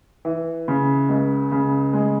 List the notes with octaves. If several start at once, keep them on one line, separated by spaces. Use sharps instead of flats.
E3
C#3
C#2
C#3
G#3